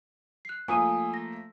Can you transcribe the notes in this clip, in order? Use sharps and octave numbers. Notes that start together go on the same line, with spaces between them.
F#6 C7
F3 A3 A#3 G#5 D#6 D#7
A#6